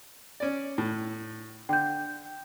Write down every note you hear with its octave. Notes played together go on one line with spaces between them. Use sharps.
C#4 D5
A2
D3 G5 G6